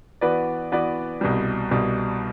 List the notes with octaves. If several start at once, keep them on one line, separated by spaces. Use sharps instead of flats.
E3 B3 F#4 B4 D5
E3 B3 F#4 B4 D5
C2 B2 G3
C2 B2 G3